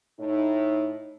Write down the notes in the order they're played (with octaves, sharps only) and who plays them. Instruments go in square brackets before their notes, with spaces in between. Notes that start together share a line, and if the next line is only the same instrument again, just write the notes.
[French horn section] A2 D#4